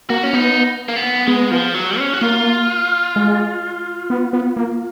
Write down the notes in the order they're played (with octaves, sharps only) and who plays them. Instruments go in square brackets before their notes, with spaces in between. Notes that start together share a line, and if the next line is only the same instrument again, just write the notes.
[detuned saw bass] A#3 [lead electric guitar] F#4
[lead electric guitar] C#4
[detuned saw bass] B3 [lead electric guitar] D#4
[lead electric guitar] A#3
B3
[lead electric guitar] G#3 [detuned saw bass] B3
[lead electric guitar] F3
F#3
C#4
F#4
[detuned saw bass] A#3 [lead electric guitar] F4
[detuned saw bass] G#3
B3
B3
A#3